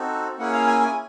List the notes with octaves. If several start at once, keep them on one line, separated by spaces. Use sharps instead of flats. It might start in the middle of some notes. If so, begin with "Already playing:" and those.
Already playing: C4 D#4 F#4 A4
A#3 C#4 E4 G#4 F#5
F5
G#5
G#5